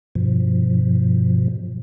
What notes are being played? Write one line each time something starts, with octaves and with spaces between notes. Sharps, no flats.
G2 B2 F3